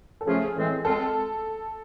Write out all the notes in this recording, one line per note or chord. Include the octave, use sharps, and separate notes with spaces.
A4
C#3 F3 A3 C#4 F4 G#4
A2 E3 G#3 C4
G#3 C4 F4 A4